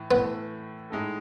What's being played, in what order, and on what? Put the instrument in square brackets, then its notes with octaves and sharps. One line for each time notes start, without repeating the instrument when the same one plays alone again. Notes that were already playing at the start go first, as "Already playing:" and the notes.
Already playing: [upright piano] A2 E3
[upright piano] A2 E3 A3 [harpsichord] B3
[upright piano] A2 G#3 D#4 A4